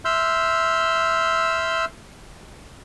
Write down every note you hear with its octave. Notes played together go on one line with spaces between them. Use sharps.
E5 C6 E6 F6 G6